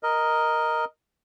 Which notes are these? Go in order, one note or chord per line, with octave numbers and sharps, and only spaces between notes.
A#4 D#5